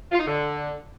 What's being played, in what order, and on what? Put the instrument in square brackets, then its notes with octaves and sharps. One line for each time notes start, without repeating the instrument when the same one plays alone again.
[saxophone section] F4
D#4
D3